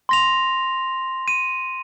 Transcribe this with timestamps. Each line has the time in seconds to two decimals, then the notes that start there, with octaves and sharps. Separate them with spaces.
0.09 C6 A#6 F7
1.28 D#7